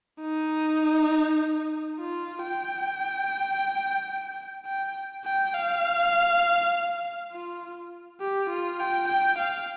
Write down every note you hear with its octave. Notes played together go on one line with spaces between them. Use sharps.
D#4
F4
G5
G5
G5
F5
F4
G4
F4
G5
G5
F5